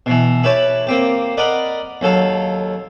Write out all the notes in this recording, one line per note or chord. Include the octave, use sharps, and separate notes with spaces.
B2 E3
E4 G4 B4 C#5 A5
A#3 C4 G4
A#4 D5 D#5 F#5 B5
D#2 F#3 A4 F5